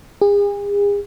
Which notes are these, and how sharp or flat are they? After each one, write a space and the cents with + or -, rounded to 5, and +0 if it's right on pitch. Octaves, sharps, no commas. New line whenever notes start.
G#4 -40